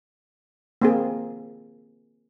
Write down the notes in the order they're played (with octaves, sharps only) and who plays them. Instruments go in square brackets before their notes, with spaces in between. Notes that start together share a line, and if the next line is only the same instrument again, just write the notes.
[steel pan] A#3 C4 G#4